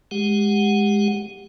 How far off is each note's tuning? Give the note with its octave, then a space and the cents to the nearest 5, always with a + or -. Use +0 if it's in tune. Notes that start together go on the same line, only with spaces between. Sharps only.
G#3 +0 G4 +10 F#5 +0